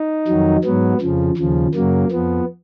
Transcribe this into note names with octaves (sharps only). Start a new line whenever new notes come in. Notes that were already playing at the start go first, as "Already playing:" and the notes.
Already playing: D#4
F2 D#3 F#3
G#2 F#3 B3
F2 C#3 F3
D#2 C#3 F3
F#2 C#3 F#3 A#3
F2 F3 B3